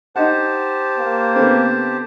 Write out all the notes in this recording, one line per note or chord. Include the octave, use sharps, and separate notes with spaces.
D#4 G4 C5 D#5 F#5 A5
A#3
D3 B3 C4